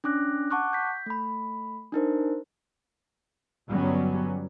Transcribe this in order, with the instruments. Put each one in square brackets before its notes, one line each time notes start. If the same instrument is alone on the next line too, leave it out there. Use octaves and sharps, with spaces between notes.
[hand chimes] C#4 D4 D6 F#6 A#6
F#5 A5 C#6 D6 F#6
G6 B6
A3 B5
D4 D#4 A#4 C5
[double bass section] G1 F#3 G3 B3 C#4